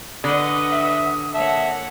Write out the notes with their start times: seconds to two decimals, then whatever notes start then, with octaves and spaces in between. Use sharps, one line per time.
0.24 D3 B4 D#5 F#5 D#6
0.71 E5
1.34 A#3 C#5 E5 F#5 A5